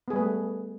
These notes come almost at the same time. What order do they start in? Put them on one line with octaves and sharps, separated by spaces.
B3 G#4 G3 B4 A3